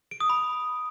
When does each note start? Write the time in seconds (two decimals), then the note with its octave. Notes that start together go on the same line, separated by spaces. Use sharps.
0.11 D7
0.20 D#6
0.30 B5